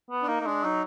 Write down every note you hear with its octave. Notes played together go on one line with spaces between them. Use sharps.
B3
D4
A#3 D#4
A#3
G#3 D4
F#3 D#4